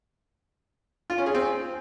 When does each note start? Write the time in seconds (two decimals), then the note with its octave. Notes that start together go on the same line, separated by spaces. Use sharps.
1.10 F4
1.18 C#4
1.26 G#4
1.35 C4